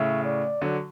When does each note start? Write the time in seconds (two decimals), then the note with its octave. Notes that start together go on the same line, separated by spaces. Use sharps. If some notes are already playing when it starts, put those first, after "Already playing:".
Already playing: A2 C#3 E5
0.24 D5
0.62 D3 F#3